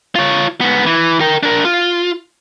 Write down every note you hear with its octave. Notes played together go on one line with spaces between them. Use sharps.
F4 C#5
G#2 B3
E3
A#4 G5
D4 A#4
F4